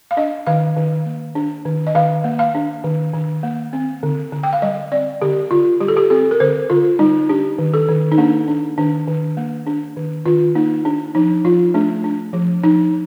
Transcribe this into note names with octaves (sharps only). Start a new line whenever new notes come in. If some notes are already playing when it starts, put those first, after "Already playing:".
F5
D4 D#5
D#3 F5
D#3
A#3
D4
D#3
D#5
D#3 F5
A#3
F5
D4
D#3
D#3
A#3
C4
D3
D3
G5
F5
G3 D#5
C4 D5
D3 G4
D3 F4
G3 G4
A4
G4
C4 A4
A#4
D3 C5
D3 F4
G3 D#4
D4 G4
D#3
A4
D#3
D#4
A#3 D4
D4
D#3 D4
D#3
A#3
D4
D#3
D#3 F4
A#3 D#4
D4
F3 D#4
F3 F4
A3 D4
D4
F3
F3 D#4